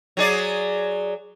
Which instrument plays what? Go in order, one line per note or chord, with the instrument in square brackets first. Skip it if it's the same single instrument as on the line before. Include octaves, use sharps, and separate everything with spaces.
[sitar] F#3 G#4 D5